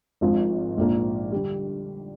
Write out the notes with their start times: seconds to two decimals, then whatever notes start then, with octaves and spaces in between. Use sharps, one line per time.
0.21 G#1 G#2 F3 C4 F4
0.77 A#1 G#2 F3 A#3
1.32 D3 G3